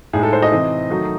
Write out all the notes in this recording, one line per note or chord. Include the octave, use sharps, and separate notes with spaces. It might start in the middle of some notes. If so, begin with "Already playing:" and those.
A2 G#3 D#4 G#4
A4
C5
D#5
C3 E3 C4
D#3 F#3 A3 D#4